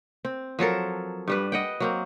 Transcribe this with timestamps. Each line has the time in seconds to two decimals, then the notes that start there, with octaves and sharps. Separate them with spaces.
0.25 C4
0.59 F3 F#3 A4 A#4
1.28 G2 G3 B4
1.52 D#5 F#5 G5
1.80 F#3 A#3 C4